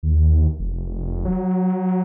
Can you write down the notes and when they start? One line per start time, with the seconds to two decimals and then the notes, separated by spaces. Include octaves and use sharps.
0.03 D#2
0.60 F1
1.25 F#3